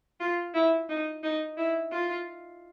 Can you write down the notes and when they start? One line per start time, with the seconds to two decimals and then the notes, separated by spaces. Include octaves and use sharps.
0.20 F4
0.54 E4
0.89 D#4
1.23 D#4
1.58 E4
1.92 F4